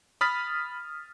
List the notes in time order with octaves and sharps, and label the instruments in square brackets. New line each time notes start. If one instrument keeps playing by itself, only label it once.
[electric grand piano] B5 D#6 F6 A6 B6